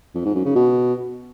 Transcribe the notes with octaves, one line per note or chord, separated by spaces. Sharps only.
F2
G#2
F#2
C#3
B2